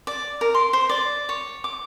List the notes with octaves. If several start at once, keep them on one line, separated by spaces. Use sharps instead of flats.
D5
A#4
C6
C5
D5
C#5
D6